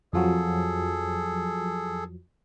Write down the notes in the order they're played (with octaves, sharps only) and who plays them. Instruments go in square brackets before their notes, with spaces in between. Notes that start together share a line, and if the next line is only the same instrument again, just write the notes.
[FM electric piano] F2 F3 F#3 [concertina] G#4 A4